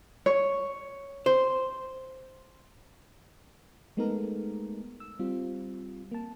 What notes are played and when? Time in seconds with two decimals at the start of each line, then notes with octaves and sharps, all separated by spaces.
0.26 C#5
1.26 C5
3.97 G#3 A3 B3 D#4 A4 A#4
5.00 E6
5.19 G3 C4 F4
6.12 A#3 A5